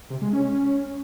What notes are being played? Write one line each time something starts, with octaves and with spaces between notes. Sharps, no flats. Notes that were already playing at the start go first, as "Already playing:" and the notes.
C3
G#3
C#4